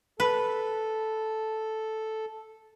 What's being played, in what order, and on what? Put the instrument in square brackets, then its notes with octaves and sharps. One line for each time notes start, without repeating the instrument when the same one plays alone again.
[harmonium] A4 [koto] B4